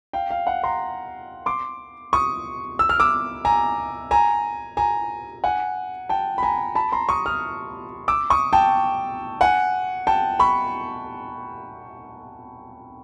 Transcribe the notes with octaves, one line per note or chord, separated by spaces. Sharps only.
F5 G5
F5
F#5
A#5 C6
C6 D6
C#6 D#6
E6
F6
D6 E6
G#5 A#5
G#5 A#5
G#5 A#5
F#5 G#5
G5 A5
B5
G#5 A#5
A5 B5
A#5 C6
C#6 D#6
D#6 F6
D6 E6
C#6 D#6
G5 A5
F#5 G#5
G5 A5
B5 C#6